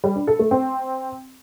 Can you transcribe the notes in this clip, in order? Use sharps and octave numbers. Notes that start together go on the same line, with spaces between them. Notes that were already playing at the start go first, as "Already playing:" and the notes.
G3
D4
A4
A3
C4